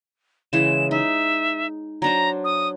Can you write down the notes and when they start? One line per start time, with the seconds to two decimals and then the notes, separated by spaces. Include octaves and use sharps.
0.53 C#3 E3 G#3 E7
0.91 D#4 E5
2.02 F#3 D4 C5 A#5
2.44 D#6